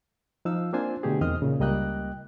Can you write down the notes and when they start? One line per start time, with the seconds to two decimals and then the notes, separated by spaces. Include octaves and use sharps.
0.45 F3 D#4 F5 E6
0.73 A#3 C4 D4 F4 C5 G#5
1.03 B2 D3 A3 G4 G#4
1.21 E2 D#3 C4 D#5 D#6 F6
1.42 A#2 C#3
1.60 C#2 G3 A#3 D#5 G5 F#6